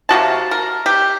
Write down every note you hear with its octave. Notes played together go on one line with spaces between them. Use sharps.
C3 A#3 F#4 A5
A#4
G4